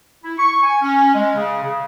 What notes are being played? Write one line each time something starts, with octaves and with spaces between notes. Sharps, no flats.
E4
C#6
G#5
C#4
G#3
C#3
C#3